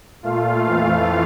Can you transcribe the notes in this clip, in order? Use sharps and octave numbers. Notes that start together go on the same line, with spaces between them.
A#2 A3 F4 F5
F2 E3 A3 F4 F5